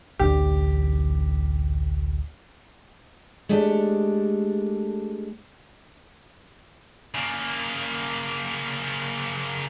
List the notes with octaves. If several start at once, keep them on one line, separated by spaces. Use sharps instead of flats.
A1 D2 D4 G4
G#3 A3 D4 G4 A4
C#3 A#3